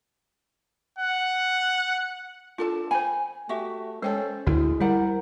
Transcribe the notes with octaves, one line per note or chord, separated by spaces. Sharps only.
F#5
D4 F4 A4 A5
C5 G5 G#5 B5
A3 F#4 G4 E5
G#3 C#4 A4 C5 G5
D2 G#3 E4
G3 E4 A#4 C5 F#5